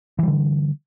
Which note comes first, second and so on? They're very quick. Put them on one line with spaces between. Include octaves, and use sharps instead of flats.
E3 G3 D3